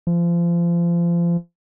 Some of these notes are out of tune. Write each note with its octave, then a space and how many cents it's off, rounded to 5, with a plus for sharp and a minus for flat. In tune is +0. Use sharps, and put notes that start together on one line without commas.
F3 -30